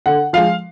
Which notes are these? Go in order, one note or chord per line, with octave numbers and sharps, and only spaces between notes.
D3 F#5
F3 G#3 F5